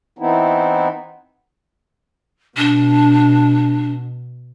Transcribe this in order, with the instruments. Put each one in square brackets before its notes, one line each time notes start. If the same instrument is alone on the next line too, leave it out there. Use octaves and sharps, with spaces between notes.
[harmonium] E3 B3 C4 D#4 E4
[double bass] B2 [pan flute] D4